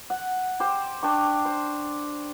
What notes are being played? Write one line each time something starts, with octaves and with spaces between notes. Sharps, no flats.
F#5
G4 C5
D4 G5 C#6
C5